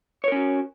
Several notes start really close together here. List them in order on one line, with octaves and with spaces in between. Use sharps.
C#5 A#4 C#4 F#4